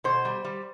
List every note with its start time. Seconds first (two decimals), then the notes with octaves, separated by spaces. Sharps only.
0.04 B2 C5
0.25 G3
0.45 G3